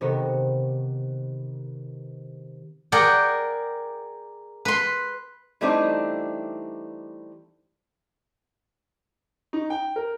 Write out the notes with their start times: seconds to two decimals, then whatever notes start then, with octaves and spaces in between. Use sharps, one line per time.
0.01 C3 D#3 B3
2.92 G#4 A#4 D5 F#5 G5
4.65 B4 C6
5.61 E3 G3 A3 C4 D4 D#4
9.53 D#4
9.70 G5
9.96 A#4